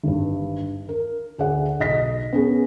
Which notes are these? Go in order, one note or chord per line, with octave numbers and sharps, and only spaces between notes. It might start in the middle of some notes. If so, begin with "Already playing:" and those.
G#1 G2
A#4
D2 G#4 D5 F#5
B1 D#5 A#6 B6
B3 C#4 G#4